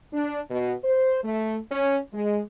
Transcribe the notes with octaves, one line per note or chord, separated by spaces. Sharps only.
D4
B2
C5
A3
C#4
G#3